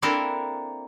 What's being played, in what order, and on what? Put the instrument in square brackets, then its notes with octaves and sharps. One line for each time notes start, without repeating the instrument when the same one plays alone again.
[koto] A#3 C4 D4 E4 A4 A#4